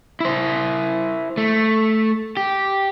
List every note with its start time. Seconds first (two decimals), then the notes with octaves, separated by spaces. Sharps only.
0.20 E4 C5
1.38 A3
2.37 G4